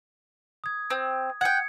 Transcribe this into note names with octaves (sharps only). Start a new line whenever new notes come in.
D#6 G#6
C4
F#5 G5 G#6 C#7